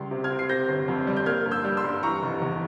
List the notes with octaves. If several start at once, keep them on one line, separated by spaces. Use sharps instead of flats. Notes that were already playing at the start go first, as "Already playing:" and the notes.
Already playing: C#2 G3 C6
C3
F6 G#6
C4
C7
C3 G6 A#6
G1
F2
G3
G6
A#3 F6 G#6
G2
E6 G6
G3
C6 E6
G2
E3 A#5 C#6
F1
E2